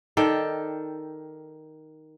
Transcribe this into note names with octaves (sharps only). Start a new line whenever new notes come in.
D#3 A4 D5 G5